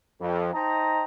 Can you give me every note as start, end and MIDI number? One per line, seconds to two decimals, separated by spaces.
0.21 0.51 41
0.54 1.05 63
0.54 1.05 72
0.54 1.05 75
0.54 1.05 79
0.54 1.05 81
0.54 1.05 82